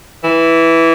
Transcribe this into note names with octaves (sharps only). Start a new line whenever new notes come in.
E3